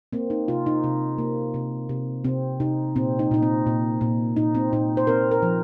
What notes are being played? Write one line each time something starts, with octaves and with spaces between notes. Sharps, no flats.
A#3 C4
D#4
C3 F4
D#4
C3
A#3
C3
C3
C3 C4
C3 D#4
A#2 C4
D#4
A#2 D#4
C4
A#2
A#2
A#2 D#4
C4
A#2 D#4
C5
C4 A#4
A#4
F3